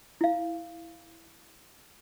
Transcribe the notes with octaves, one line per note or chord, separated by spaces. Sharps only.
E4 F5